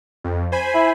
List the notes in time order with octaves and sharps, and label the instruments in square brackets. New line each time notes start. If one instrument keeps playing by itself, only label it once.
[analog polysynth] F2
C5 G#5 B5
[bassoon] E4